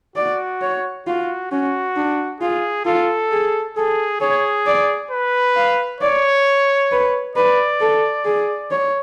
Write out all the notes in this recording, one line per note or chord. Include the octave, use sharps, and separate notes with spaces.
F#4 D5
C#5
F4 F#4
C#4 F#4
D4
F4 G#4
F4 A4
G#4
G#4 A4
G#4 C#5
D5
B4
F5
C#5 D5
B4
B4 D5
A4
G#4
C#5